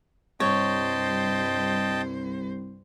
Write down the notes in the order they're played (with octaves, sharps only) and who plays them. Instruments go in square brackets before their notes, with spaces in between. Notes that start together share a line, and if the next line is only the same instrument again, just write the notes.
[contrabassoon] C2 [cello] G2 C5 [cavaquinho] C#5 [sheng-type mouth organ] D#5 G5 A5